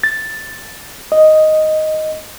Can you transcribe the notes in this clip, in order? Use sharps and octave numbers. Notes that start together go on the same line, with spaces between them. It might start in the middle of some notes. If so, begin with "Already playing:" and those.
A6
D#5